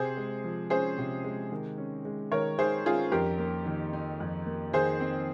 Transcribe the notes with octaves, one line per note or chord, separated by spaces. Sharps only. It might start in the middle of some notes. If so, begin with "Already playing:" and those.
Already playing: C3 G#4 C5
G#3
F3
C#4 G#4 C5
C3
G#3
D#3
C#4
G#3
D#3 A#4 C#5
D#3 G#4 C5
C#4 F4 G#4
F2 G4 A#4
A#3
D#3
D#4
F2
A#3
D#3 G#4 C5
C4